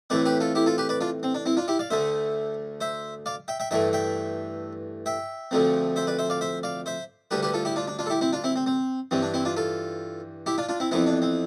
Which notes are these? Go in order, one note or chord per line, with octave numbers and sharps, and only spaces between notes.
A2 E3 A3 C4 B4 D5
G4 B4
F4 A4
E4 G4
F4 A4
G4 B4
B4 D5
D4 F4
C4
D4
C4 E4
D4 F4
E4 G4
D5 F5
D2 D3 A3 C5 E5
C5 E5
D5 F5
E5 G5
E5 G5
G2 E3 A3 E5 G5
E5 G5
E5 G5
D2 D3 F3 A3 C4
C5 E5
B4 D5
C5 E5
D5 F5
C5 E5
D5 F5
C5 E5
D2 D3 G3 G4 B4
G4 B4
F4 A4
E4 G4
D4 F4
D4
D4 F4
A4
E4 G4
C4 E4
D4 F4
C4 E4
C4
C4
G2 E3 G3 C4
D4
C4 E4
D4 F4
F4 A4
E4 G4
D4 F4
D4 F4
C4 E4
F2 E3 B3 C4 E4
D4
C4